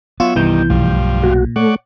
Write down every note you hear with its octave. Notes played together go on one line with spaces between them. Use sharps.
F#3 B3 F4 C#5 E5
C2 G2 D#3 E3 G6
B1 G2 F3 A3
A#2 F#4
A3 C#5 D5 F#5